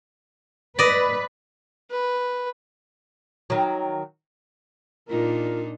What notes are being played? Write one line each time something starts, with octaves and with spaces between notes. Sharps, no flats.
B4 D5 D#5
B4
D#3 F#3
A#2 D4 D#4 F4 A#4